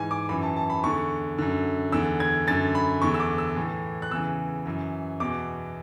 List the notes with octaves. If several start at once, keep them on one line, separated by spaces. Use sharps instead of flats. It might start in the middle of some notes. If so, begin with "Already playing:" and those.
Already playing: G#2 E3 G#5
D6
F#2 E3 B5
A5
A5
B5
E2 D3 C#6
F#2 D3
E2 D3 E6
G#6
F#2 D3 A6
B5
E2 D3 C#6
E6
D6
E6
A2 E3
F#6
E2 C#3 E3 E6
F#2 E3
E2 B2 D6